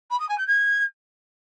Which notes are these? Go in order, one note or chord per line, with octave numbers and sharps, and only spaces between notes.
B5
D#6
G#5
G6
G#6